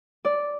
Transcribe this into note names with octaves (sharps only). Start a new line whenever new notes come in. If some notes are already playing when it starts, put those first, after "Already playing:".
D5